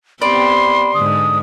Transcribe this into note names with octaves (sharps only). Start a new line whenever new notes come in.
B3 C4 G4 D5 B5 C6
G#2 D3 D#6